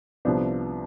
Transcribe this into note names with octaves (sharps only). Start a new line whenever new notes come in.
C2 C3 F3 B3 D4